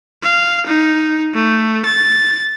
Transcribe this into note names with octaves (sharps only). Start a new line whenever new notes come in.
F5
D#4
A3
A6